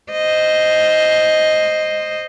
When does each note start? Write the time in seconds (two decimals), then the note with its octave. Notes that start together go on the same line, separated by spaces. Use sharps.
0.12 C5 D#5